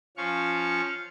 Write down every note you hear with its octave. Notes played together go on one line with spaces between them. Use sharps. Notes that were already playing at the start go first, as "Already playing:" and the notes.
F3 C#4 F5 C#6